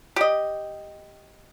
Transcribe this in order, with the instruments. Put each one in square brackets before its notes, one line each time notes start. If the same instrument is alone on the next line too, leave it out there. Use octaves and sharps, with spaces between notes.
[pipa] G4 D#5